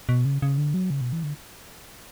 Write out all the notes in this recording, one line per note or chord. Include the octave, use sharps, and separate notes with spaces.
B2
C#3
C#3
D3
F#3
C#3
B2
E3
D3